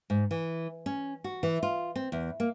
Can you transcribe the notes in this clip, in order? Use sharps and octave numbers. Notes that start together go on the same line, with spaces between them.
G#2
E3
C#4
F#4
E3
F4
C4
E2
A#3